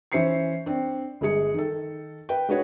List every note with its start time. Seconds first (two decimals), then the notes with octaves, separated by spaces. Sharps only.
0.12 E3 C#4 C5 E5 C7 C#7
0.66 C4 D4
1.21 G1 G#3 G#4 C#7
1.54 D#3 A4
2.29 B4 G5
2.49 G#3 D4 F#4 B4 C#5